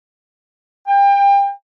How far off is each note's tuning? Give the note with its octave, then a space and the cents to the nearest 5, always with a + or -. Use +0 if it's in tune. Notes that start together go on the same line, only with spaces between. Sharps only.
G5 +30